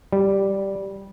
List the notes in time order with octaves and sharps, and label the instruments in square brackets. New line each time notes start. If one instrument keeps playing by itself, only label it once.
[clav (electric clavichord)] G3